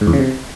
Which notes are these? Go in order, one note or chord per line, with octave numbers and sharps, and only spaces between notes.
G#2
E2
C#3
C3